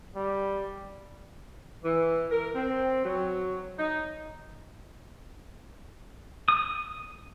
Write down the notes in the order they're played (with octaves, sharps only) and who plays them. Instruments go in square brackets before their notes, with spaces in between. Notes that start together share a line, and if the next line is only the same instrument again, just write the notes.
[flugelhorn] G3
[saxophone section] E3
A#4
C4
F#3
D#4
[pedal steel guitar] D#6